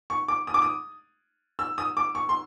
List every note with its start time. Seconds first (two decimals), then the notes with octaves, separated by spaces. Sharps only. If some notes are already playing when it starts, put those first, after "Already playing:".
0.10 C#6
0.28 D6
0.47 D#6
0.54 D6
0.62 D#6
1.59 E6
1.78 D#6
1.97 D6
2.15 C#6
2.29 C6